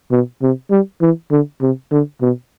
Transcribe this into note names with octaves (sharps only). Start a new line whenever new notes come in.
B2
C3
G3
E3
D3
C3
D3
B2